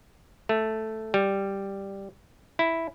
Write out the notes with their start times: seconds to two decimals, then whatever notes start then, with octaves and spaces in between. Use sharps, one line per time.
0.49 A3
1.14 G3
2.59 E4